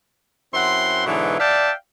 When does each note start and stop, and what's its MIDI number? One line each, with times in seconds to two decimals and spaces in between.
0.54 1.05 42
0.54 1.05 60
0.54 1.05 64
0.54 1.05 78
0.54 1.05 84
1.06 1.40 44
1.06 1.40 47
1.06 1.40 50
1.06 1.40 52
1.06 1.40 54
1.40 1.71 74
1.40 1.71 76
1.40 1.71 77
1.40 1.71 79
1.40 1.71 81